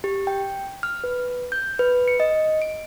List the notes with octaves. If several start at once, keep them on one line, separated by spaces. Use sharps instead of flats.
G4
G5
F6
B4
G6
B4
C#7
D#5
D7